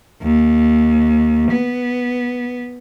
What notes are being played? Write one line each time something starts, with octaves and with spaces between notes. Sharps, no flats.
D#2
B3